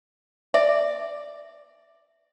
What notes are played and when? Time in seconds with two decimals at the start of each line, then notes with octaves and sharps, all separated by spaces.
0.54 D5 E5